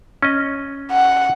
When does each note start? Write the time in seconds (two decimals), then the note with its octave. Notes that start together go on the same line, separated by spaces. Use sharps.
0.22 C#4 D#5
0.91 F#5